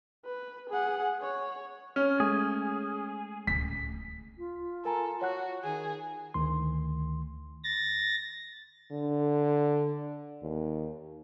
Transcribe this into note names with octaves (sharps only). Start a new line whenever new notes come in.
B4
G#4 F#5
C#5
C#4 F6
G#3 A3 G#4
D1 C#2 B6
F4
A4 A#4 G#5 A#5
F#4 C#5 F#5 F#6
D#3 G#4
D2 D#3 C6
A6 A#6
D3
D#2